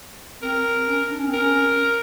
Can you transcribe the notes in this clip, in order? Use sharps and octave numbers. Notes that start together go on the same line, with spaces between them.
C4 A#4
C#4
D4
C#4
C4
C#4 A#4